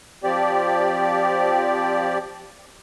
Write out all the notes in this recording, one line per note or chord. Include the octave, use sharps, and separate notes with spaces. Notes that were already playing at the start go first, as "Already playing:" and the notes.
F3 C4 G4 D5